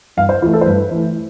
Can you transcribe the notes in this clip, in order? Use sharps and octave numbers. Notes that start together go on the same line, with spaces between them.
G2 F5
C5
E3 A3 F4
A4
C5
G2 B4
E3 A3